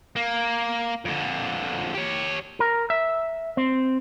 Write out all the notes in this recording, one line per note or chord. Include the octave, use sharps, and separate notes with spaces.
A#3
F2 D3
G4 C#5
A#4
E5
C4